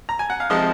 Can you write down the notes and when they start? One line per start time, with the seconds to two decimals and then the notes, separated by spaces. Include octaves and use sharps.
0.09 A#5
0.19 G#5
0.30 F#5
0.40 F5
0.50 C3 F3 G#3 C4 D#4 D#5